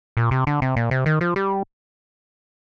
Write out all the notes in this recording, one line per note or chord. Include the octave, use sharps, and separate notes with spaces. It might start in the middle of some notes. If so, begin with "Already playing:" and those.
A#2
C3
D3
C3
A#2
C3
D#3
F3
G3